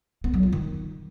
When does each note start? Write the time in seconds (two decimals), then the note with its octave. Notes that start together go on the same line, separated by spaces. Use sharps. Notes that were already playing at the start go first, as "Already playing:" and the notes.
0.24 B3
0.34 F#3
0.43 F4
0.53 D#3